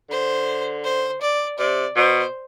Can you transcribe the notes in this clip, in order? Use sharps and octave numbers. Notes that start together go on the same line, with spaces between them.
D3 C5
C5
D5
C3 D5
B2 C5